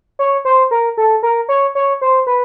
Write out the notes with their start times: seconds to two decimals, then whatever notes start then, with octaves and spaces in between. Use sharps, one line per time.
0.19 C#5
0.45 C5
0.71 A#4
0.97 A4
1.23 A#4
1.49 C#5
1.75 C#5
2.01 C5
2.27 B4